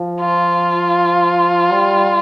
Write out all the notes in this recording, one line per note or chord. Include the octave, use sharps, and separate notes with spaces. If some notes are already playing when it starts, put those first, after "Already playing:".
Already playing: F3
F4
G3